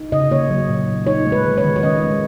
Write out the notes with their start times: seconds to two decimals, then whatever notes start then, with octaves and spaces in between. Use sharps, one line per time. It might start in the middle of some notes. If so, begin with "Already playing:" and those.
Already playing: D#4
0.12 C#3 D#5
0.31 A#3 C#5
0.50 F#3
0.69 A#2
0.88 A#2
1.07 D#4 C#5
1.27 G#3
1.32 B4
1.45 D#3
1.57 C#5
1.64 D#3
1.76 C#5
1.83 C#4 D#5
2.03 G#3